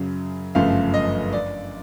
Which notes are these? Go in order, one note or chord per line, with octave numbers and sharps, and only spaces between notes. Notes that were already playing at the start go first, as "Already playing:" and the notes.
Already playing: F#2 C#3 F#3
G1 F#2 C#3 F3 A3 F5
D#5
D5